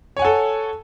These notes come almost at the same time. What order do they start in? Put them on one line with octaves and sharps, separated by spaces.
C#5 G#5 F#5 A4